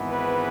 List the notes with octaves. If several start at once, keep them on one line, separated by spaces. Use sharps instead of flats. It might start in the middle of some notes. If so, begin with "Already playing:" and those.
Already playing: G#1 G#2 E3 B3
B4